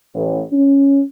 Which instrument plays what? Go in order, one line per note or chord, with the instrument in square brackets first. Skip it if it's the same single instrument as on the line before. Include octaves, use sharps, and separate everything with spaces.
[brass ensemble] A1
C#4